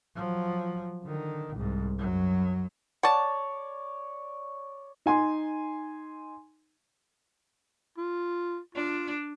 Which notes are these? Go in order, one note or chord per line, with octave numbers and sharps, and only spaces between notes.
F3 F#3
D3 D#3
C2 G#2
F#2 F#3
C#5 D5 F#5 A5
D#4 G#5 C6
F4
D4 F4